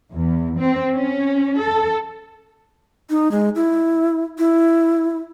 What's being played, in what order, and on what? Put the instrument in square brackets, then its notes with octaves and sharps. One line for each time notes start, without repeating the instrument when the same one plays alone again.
[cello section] E2
C4
C#4
A4
[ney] D#4
G#3
E4
E4